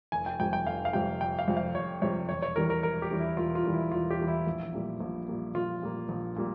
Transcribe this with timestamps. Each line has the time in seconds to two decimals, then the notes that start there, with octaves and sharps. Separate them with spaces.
0.12 F1 G#5
0.26 G5
0.40 F2 C3 G3 G5
0.53 G5
0.66 F1 F5
0.85 F5
0.93 F2 C3 G3 G5
1.21 F1 G5
1.39 F5
1.48 F2 C3 G3
1.57 F5
1.75 F1 C#5
2.02 F2 C3 G3 C#5
2.29 E1 C#5
2.42 C#5
2.56 E2 E3 G3 A#4
2.70 A#4
2.83 E1 A#4
3.02 G4
3.11 E2 E3 G3
3.20 E4
3.37 E1 F4
3.55 F4
3.64 E2 E3 G3
3.74 E4
3.91 E1 F4
4.10 G4
4.19 E2 E3 G3
4.28 E4
4.47 A#1
4.73 A#2 G3 A#3
5.00 A#1
5.28 A#2 G3 A#3
5.55 A#1 F4
5.82 A#2 G3 A#3
6.09 A#1
6.36 A#2 G3 A#3